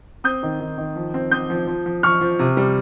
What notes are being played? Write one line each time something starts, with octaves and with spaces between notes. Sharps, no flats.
C4 D#6 G6
D#3
D#3
D#3
F3
C4
C4 D#6 G6
F3
F3
F3
F3 C#6 F6
F3
C3
G3